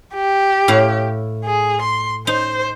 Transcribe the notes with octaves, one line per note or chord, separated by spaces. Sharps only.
G4
A2 E4 F5
G#4
C6
D#4 C5